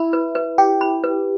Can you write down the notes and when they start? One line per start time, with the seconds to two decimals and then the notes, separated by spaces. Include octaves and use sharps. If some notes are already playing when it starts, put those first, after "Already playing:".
Already playing: E4 B5
0.13 B4
0.35 B4
0.58 G4 G5
0.81 B5
1.04 B4